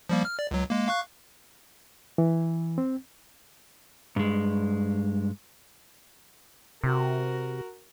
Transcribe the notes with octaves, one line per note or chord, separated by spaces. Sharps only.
F3 G3 A#3
F6
D5
C#2 F#3
G#3 A#3
F5 C#6 F#6
E3
C4
G2 G#3
C3 F#4 A#4